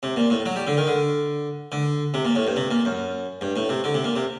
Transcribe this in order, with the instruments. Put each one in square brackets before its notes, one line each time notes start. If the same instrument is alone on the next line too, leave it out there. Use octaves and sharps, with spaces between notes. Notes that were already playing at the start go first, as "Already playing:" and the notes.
[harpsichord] C3
A#2
A2
F#3
G3
D3
D#3
D3
D3
C3
A#2
A2
G2
C3
A#2
F#2
G2
A2
C3
D3
C3
A#2
C3